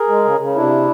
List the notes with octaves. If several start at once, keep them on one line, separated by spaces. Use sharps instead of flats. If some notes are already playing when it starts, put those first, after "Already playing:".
Already playing: G#4 A#4
G#3
C#3
C#3
C3 D4 E4